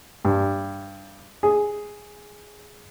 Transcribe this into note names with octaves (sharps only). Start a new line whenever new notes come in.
G2
G#4